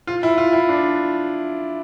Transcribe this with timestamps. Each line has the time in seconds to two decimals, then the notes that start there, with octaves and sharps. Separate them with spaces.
0.07 F4
0.23 E4
0.38 F4
0.53 E4
0.69 D4